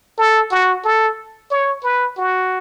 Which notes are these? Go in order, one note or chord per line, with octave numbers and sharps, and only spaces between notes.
A4
F#4
A4
C#5
B4
F#4